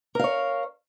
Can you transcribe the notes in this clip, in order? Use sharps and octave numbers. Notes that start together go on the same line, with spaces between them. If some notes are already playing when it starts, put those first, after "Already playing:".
A#4 C#5 F5